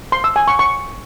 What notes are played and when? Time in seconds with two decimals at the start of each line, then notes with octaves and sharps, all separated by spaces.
0.12 C6
0.24 E6
0.36 G#5
0.48 C#6
0.59 C#6